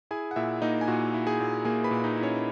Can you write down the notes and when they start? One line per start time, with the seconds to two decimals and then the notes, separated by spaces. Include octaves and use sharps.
0.11 E4 G#4 G#5
0.31 F#5
0.36 A#2 E4 E5
0.62 A#3 D#4 D#5
0.81 G#5
0.88 A#2 F#4 F#5
1.14 E4
1.27 G#4 G#5
1.40 A#2
1.65 A#3 G#4 G#5
1.84 B4 B5
1.91 A#2
2.04 D#4 D#5
2.17 E4
2.23 C#4 C#5